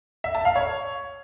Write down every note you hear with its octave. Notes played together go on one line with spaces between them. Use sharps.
E5
A5
F5
C#5